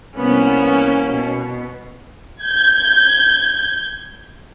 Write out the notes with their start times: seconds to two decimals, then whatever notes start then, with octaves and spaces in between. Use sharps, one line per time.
0.17 C2 A#3 B3 C#4
1.06 B2
2.42 G6 G#6